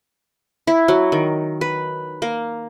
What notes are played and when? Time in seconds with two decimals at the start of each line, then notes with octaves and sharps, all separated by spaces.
0.67 E4
0.88 F#3
1.12 D#3
1.61 B4
2.22 A#3